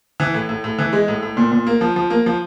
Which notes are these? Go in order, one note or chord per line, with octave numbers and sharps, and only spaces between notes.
E3
A2
A2
A2
E3
G#3
A2
A2
A#2
A#2
A#3
F3
F3
A#3
F3